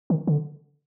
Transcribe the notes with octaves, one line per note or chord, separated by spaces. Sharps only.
D#3
D3